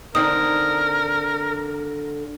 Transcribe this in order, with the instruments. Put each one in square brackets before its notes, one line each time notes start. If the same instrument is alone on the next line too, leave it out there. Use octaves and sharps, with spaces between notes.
[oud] D3 C4 D#4 [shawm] A#4 [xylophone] D#6